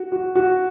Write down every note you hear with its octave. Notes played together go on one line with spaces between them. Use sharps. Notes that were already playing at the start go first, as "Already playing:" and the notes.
Already playing: F#4
F#4
F#4